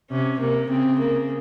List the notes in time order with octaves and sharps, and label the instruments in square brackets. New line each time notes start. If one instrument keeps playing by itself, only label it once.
[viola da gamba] C3 [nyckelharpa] C#4
[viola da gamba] C3 [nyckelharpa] A#3
[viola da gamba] C#3 [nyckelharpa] C4
[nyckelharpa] A#3